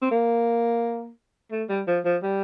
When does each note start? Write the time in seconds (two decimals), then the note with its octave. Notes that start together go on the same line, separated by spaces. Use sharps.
0.02 C4
0.11 A#3
1.52 A3
1.69 G3
1.87 F3
2.05 F3
2.23 G3